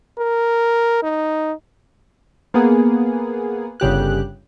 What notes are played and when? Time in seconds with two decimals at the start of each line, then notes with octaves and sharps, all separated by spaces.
0.19 A#4
1.03 D#4
2.54 A#3 B3 G#4
3.80 G1 C#3 G4 F#6